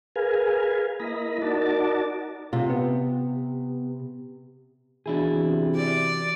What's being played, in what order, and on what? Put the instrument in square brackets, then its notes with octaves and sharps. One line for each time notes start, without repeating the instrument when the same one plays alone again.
[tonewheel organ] G#4 A#4 B4 F5 G#5
A#3 E4 D#5 A#5 B5
D#4 F#4 A#4 D5 A5
[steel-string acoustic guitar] C3 [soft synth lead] F4
[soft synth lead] B3
[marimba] E3 B3 F#4 [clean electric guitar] D4 E4 G#4
[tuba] C3
[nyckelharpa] D5